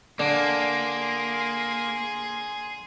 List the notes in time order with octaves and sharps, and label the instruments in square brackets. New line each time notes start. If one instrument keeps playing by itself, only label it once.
[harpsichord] D3 [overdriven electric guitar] A#3 [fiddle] G#4 C6